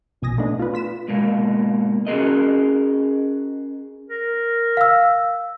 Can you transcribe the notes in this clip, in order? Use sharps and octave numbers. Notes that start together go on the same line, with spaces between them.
A#1 B2 G#5 D#6 A#6
A3 B3 D4 D#4
F4 B4
F4 B6 E7
G#2 B2 A#3
C#4 F#4 G#4 A#4 D#5
A#4
F5 E6